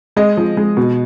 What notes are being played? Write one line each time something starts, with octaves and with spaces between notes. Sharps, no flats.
G#3 D#5
F3
G#3
B2